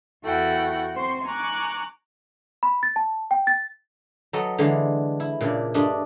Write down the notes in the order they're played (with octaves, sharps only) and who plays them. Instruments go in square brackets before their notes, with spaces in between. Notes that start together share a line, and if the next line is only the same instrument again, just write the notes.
[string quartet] E2 E4 F#4 A4 F#5 G5
C4 C5 C6 C#6
G#5 A#5 C#6 D6 F#6
[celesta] B5
A6
A5
G5
A6
[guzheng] F#3 A4 B4 D#5
D3 E3 G#3 D4 F5
E4
A#2 C#3 D4
G2 A3 D4 D#5